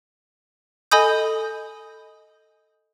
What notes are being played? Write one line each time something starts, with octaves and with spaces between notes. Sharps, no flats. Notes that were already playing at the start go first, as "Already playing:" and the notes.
A4 D#5 G#5 B5 D#6 G6